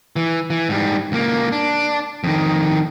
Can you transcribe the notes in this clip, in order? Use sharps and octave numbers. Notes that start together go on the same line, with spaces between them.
E3
E3
G#2 G3
C#2 A#3
D4
F2 D#3